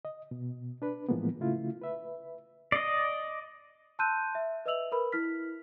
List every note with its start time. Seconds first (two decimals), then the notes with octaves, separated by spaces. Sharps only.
0.05 D#5
0.31 B2
0.82 D4 B4
1.09 A2 E3 F3 G#3 A#3 B3
1.40 C#3 A3 E4 F4
1.82 B4 E5
2.72 D5 D#5
3.99 A5 C6 E6 F#6 G6 D#7
4.35 E5
4.66 B4 D#5 E5 E6 F7 F#7
4.92 A#4 B4 B5
5.12 E4 F6 B6